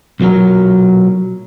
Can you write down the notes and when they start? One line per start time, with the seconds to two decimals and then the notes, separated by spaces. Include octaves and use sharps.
0.20 B1 A#2 F3 F#3 A#4